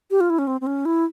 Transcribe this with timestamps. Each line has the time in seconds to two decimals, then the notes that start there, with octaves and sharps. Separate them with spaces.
0.11 G4
0.20 F4
0.30 E4
0.39 C#4
0.47 C4
0.61 C4
0.67 C#4
0.85 E4